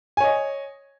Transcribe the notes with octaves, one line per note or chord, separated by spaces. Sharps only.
C#5 D#5 G#5